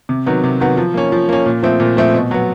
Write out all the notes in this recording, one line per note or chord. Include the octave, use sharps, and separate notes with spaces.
C3
D#3 F#3 B3
C3
D#3 F#3 B3
F3
A#3 C#4
F3
A#3 C#4
A#2
F3 A3 C4
A#2
F3 A3 C4
B2
F#3 B3